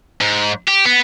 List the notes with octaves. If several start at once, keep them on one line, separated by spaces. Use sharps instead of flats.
G#2
G4
B3